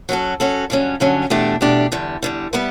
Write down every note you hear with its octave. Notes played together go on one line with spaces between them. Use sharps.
F#3 C#4 F#4 A4
F#3 C#4 F#4 A4
G2 D3 F#3 C#4
G2 D3 F#3 C#4
E2 B2 A3 D4 G4
E2 B2 A3 D4 G4
E2 D3 G3
E2 D3 G3
G3 B3 E4 B4